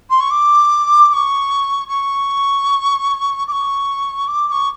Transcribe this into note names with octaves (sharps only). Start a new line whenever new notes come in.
C6
C#6
D6
D6
C#6
C#6
D6
C#6
D6
D6
C#6